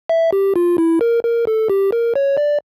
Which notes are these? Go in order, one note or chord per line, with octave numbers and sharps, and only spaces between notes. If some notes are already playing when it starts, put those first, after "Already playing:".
E5
G4
F4
E4
A#4
A#4
A4
G4
A#4
C#5
D5